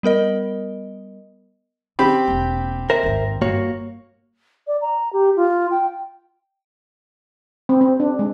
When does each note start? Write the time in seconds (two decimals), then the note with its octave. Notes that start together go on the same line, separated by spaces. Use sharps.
0.03 G3 B3 A#4 D#5
1.99 D3 C4 G4 B5
2.27 E1 A#3
2.90 A#4 C5 E5
3.03 G#1 D#2
3.42 G1 G2 A#3 F#4 C#5
4.67 D5
4.82 A#5
5.13 G4
5.36 F4
5.71 G5
7.69 C4
7.81 C4
8.00 D4
8.19 G#3